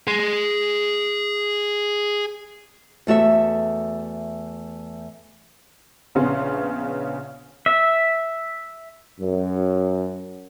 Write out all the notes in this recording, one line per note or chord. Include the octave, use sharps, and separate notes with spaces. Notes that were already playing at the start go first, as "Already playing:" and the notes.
G#4 C6
E2 A3 F#4 E5
A#1 C#3 B3 C#4 C6
E5
F#2